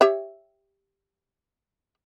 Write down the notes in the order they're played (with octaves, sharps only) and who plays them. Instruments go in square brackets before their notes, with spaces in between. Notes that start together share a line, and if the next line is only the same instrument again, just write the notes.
[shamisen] G4 C#5 E5